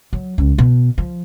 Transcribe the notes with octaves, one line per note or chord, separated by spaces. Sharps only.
F#3
C#2
B2
F3